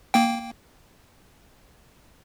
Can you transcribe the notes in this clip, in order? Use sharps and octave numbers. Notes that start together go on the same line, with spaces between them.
A#3 G5